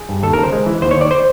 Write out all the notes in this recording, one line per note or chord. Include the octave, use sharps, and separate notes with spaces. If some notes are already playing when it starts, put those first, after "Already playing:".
Already playing: G#4
G2
D#2 A4
C#3 A#4
C5
G#3
E3
D#2 C5
C#5
D#2 D5
C5